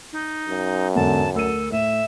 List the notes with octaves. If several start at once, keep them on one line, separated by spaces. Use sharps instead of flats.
D#4
F#2
E2 G#2 D3 A5
D2 A4 A#4 D#7
A2 E5